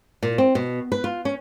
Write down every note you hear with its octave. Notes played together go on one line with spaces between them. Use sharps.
A#2
C4
B2
B4
F4
C#4